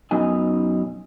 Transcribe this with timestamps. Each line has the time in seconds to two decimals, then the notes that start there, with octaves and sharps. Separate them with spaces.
0.11 F#2 B2 D#4 G#5